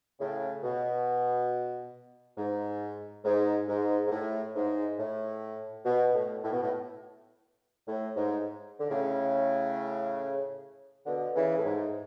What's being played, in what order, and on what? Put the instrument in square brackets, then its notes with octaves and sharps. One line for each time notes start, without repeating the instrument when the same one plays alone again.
[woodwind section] A2 C#3
B2
G#2
G#2
G#2
G#2
A2
G#2
A2
B2
A2
A2
B2
A2
A2
G#2
D3
A2 C#3
B2 D3
C#3 E3
A2
G#2